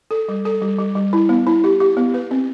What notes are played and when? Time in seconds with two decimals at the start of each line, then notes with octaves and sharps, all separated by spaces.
0.11 A4
0.29 G3
0.45 A4
0.62 G3
0.78 G3
0.95 G3
1.13 E4
1.29 B3
1.47 E4
1.64 G4
1.80 G4
1.97 B3
2.14 B4
2.31 C4